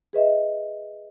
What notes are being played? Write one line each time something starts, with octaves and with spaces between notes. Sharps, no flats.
G#4 B4 D#5 E5